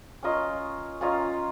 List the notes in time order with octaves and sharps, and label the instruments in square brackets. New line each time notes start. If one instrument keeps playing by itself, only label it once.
[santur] C#4 F4 A#4 D#5
C#4 F4 A#4 D#5